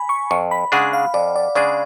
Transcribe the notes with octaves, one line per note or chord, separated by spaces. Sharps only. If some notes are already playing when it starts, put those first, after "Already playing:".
Already playing: G#5 B5
C#6
F2 C#6
B5
C#3 G#3 D4 G#4 F#5
F5
F2 D5
D5
C#3 G#3 D4 G#4 D5